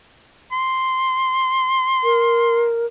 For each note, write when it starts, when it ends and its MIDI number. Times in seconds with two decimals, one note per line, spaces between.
0.52 2.66 84
2.04 2.86 70